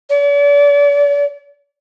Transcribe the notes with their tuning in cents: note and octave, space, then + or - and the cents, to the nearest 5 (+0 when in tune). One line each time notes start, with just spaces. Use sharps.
D5 -40